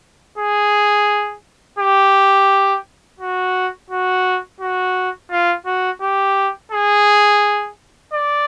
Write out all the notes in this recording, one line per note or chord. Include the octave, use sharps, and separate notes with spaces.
G#4
G4
F#4
F#4
F#4
F4
F#4
G4
G#4
D5